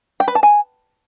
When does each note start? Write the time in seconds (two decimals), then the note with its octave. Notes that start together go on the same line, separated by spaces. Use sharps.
0.20 G5
0.28 B4
0.35 A5
0.43 G#5